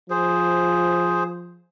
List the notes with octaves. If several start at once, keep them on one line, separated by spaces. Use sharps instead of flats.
F3 G#4 C5